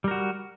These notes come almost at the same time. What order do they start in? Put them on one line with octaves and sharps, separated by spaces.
G3 A#4 F#4